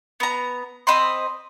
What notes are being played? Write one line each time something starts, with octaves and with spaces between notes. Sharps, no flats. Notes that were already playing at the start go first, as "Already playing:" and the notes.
B3 A#5
C4 D#5 B5 C6